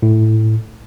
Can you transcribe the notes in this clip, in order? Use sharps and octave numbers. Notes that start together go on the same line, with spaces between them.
A2